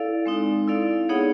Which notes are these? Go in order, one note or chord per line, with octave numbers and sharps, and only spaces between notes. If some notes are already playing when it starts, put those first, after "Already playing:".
Already playing: E4 A4 D5 F5
G#3 C4 D#4
E4 A4 D5 F5
B3 D#4 G#4 C#5 F#5